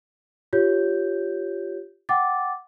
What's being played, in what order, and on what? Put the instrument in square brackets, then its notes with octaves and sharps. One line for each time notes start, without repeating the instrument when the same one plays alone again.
[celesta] F4 G4 C#5 G6
F#5 G5 D6 A6